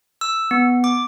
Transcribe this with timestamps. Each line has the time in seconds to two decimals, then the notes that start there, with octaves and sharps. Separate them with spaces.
0.21 E6
0.51 B3
0.84 D6